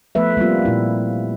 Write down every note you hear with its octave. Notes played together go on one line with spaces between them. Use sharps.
F3 A3 B3 B4 E5
G3 A#3 C4 F4
A#2 E4